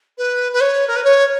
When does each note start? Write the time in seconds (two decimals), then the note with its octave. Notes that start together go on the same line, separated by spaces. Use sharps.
0.18 B4
0.53 B4
0.61 C#5
0.88 A#4
0.96 B4
1.04 C#5